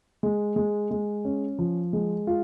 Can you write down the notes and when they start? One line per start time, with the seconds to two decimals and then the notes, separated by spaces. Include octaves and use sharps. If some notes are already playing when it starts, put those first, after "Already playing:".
0.23 G#3
0.56 G#3
0.91 G#3
1.25 C#4
1.59 F3
1.93 G#3
2.27 F4